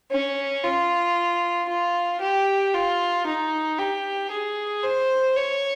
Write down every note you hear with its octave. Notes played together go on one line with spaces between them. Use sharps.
C#4
F4
F4
G4
F4
D#4
G4
G#4
C5
C#5